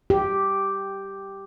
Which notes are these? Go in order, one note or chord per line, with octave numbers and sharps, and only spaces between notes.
G4